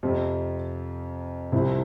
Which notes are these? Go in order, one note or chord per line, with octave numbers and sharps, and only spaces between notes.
F2 C3 F3
C2 C3 F3 C4 E4